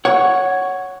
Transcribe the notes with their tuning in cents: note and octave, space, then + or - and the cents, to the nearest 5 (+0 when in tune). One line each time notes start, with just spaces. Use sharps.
C#5 +0 F#5 +0